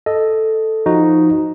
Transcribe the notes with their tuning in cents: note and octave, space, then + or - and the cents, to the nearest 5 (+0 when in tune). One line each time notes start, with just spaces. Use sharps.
A4 +0 D#5 +0
F3 +0 D#4 +0 F#4 +0